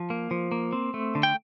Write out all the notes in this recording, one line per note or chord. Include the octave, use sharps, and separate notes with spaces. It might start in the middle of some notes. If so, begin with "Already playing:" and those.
Already playing: F3
A#3
F3
A#3
C4
A3
D3
G5